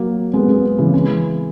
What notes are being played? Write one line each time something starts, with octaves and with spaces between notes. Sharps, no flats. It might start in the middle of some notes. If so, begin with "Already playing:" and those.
Already playing: F#3 A#3
G#3 B3
G#3 B3
C#3 E3
E3 G#3